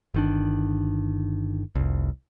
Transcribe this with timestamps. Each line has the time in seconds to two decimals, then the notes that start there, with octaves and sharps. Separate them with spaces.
0.14 G1 D#3 D4
1.75 F1 C2